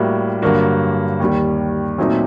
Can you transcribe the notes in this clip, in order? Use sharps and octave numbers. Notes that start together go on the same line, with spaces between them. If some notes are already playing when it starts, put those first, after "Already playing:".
Already playing: A2 G3 A#3 F#4
G2 D3 F#3 A#3 F#4
D#2 D#3 G3
A#2 F#3 A3 C4 D#4